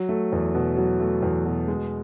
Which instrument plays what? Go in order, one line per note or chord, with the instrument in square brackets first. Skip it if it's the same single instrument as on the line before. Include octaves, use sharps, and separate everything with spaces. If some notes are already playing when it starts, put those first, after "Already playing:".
Already playing: [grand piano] F#3
A3
E2
B2
F#3
A3
E2
B2
G#3